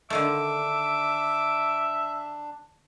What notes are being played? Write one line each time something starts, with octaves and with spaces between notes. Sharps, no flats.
D3 D#3 A3 D4 E5 D6